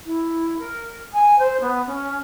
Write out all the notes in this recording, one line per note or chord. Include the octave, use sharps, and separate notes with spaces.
E4
A#4
G#5
C5
B3
C#4